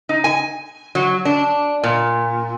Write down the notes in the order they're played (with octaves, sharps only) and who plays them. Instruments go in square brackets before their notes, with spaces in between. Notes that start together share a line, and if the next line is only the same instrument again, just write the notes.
[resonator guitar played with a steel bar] D#4
G#5
F#3
D4
A#2